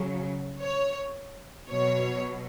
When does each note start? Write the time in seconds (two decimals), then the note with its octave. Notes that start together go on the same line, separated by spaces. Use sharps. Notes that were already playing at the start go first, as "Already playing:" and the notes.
Already playing: C#3 F#3
0.61 C#5
1.70 B2 F#3 C#5